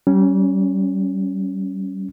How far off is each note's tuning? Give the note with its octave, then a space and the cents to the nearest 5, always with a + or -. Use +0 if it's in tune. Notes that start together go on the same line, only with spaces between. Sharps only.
G3 -30 C#4 +0